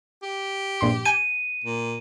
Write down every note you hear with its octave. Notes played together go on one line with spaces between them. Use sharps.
G4
A#1 G2 C6
G#5 G6 G#6 D#7
A#2